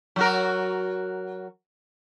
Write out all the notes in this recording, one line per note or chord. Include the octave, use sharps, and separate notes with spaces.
F#3 F#4 A#4